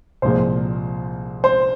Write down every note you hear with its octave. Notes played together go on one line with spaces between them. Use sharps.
C2 A#2 F3 G#3 C5
C5